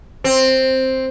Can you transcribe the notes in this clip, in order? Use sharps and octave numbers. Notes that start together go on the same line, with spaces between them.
C4